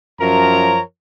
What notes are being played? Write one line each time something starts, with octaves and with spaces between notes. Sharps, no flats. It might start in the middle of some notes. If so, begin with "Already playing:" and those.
F#2 F3 A#4 C#5 A#5